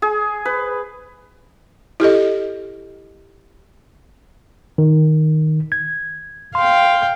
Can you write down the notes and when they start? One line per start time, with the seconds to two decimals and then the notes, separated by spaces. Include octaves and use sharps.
0.02 G#4
0.45 B4
2.00 E4 G4 A4 D#5
4.78 D#3
5.72 G#6
6.55 F5 G5 C6